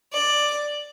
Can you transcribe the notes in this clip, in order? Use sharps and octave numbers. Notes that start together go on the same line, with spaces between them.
D5